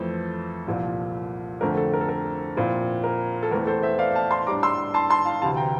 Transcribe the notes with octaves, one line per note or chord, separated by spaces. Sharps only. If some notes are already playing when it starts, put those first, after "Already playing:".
Already playing: F2 E3 A3 A4 C5
C2 A#2 F3
F2 D3 A3 C4 A#4
A4
A#4
A4
A#4
A#2 F3 C4 E4
A#4
A4
E2 E3 A3 C4 A#4
A4 C5
C5 E5
D5 F5
F5 A5
A5 C6
A2 G3 D4 A#5 D6
C6 E6
A5 C6
A5 C6
F5 A5
D2 C3 E3 F5 A5
G5 A#5